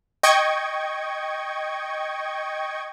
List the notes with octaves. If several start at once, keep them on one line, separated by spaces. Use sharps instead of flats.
D#5 G5 C#6 G#6